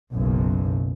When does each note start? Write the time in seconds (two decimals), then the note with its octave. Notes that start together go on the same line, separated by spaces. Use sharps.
0.12 F#1 B1 F#2